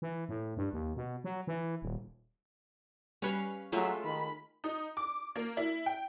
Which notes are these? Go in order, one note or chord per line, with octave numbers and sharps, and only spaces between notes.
E3
A2
G2
D#2
B2
F#3
E3
D#1
G3 C#4 B4 C#5 F5
F#3 G#3 A3 F4 E5
D#3 B5
D#4
D6
A#3
E4
G5